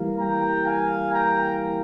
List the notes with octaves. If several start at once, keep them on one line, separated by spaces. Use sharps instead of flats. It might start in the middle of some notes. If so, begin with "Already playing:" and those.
Already playing: E3 G3 A#3
G5 A#5
F5 G#5
G5 A#5